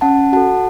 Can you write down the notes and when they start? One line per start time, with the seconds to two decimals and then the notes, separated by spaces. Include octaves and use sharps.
0.01 C#4 F#5 A5
0.33 F#4 A4 F#5 A5